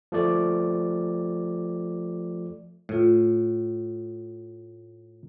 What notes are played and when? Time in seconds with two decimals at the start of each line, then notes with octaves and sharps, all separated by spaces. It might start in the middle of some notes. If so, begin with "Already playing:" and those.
0.12 F3 A3 D5
2.89 A2 A3 F4